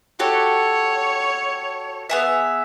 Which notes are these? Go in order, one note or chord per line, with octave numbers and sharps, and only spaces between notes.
F#4 G4 A4 C#5
B3 G#4 E5